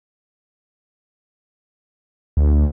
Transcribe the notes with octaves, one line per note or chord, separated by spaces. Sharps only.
D2